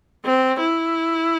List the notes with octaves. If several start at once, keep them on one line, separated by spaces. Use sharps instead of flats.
C4
E4